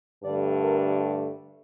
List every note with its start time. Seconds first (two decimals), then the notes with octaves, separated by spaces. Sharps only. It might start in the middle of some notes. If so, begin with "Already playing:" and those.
0.24 G2 D3 A3 D5
0.63 A#4
1.01 G4